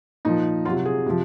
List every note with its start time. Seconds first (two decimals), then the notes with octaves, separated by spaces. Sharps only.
0.25 A#2 F3 D#4
0.65 F#3 F4
0.69 C3
0.85 G#4
1.06 C3 F3